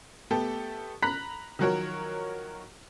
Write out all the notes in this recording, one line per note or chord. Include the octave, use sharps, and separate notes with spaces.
A3 B3 G4 A4
A#5 B5 F#6 B6
D#3 F3 F#3 F#4 A#4 C#5